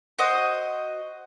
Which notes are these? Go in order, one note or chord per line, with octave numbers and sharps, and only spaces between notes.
F#4 C5 D#5